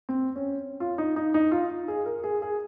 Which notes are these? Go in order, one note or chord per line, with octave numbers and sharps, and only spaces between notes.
C4
C#4
F4
D#4
D#4
D#4
F4
G#4
A#4
G#4
G#4